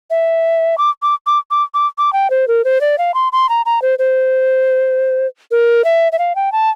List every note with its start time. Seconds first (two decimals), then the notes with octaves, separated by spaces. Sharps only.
0.10 E5
0.78 D6
1.02 D6
1.27 D6
1.51 D6
1.74 D6
1.98 D6
2.13 G5
2.30 C5
2.48 A#4
2.64 C5
2.81 D5
2.98 F5
3.14 C6
3.32 C6
3.49 A#5
3.66 A#5
3.82 C5
3.99 C5
5.51 A#4
5.84 E5
6.12 E5
6.19 F5
6.35 G5
6.52 A5